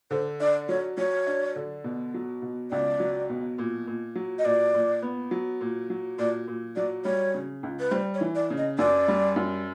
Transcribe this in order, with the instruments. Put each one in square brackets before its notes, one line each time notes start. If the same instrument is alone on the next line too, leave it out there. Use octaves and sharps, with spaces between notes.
[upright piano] D3 [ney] C5
[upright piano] D4 [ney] D5
[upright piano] F#3 [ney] C#5
[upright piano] F#3 [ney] C#5
[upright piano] D4
D3
B2
F#3
B2
[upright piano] C#2 [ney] D5
[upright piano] F#3
B2
A#2
A#2
F#3
[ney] D#5
[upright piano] A#2 [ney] D5
[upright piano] A#2
B3
F#3
A#2
F#3
[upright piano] A#2 [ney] D5
[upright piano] A#2
[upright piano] F#3 [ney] D5
[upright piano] G3 [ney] C#5
[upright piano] C#3
C#2
[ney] B4
[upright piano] G3 [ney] C5
[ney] C#5
[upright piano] E3
[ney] D5
[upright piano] C#3
[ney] D#5
[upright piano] F#2 [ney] D5
[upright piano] G3
F#2